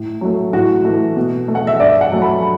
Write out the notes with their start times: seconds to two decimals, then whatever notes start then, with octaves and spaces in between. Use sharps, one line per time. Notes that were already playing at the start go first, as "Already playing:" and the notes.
Already playing: A2
0.21 F#3 A3
0.53 A2 F#4
0.84 E3 A3
1.16 B2
1.48 A3
1.55 F#5
1.67 E5
1.79 G2 D5
2.01 F#5
2.12 F#3 A3
2.22 B5